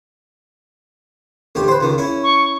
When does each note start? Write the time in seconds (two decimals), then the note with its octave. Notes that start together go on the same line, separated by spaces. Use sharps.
1.55 A1 D2 G4
1.68 B4 C5
1.81 C#2 D#3
1.98 C#4 E4
2.23 C#6